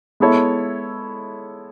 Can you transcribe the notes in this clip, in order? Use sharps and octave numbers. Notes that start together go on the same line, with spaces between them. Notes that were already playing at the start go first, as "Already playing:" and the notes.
G#3 B3 E4 A4 C#5